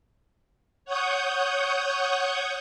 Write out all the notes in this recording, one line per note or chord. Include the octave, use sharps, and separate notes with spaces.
C#5 F#5 C#6 D#6 G6